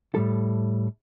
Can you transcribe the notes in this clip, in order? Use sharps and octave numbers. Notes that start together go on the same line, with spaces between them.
A2 G3 A4